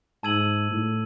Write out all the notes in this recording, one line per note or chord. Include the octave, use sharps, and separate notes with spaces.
G#2 A5 E6 G#6 D#7 F#7
A2